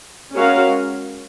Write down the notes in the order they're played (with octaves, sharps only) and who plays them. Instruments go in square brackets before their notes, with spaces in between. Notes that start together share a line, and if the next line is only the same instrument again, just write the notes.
[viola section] G#3 C#4 F#4 A#4 F5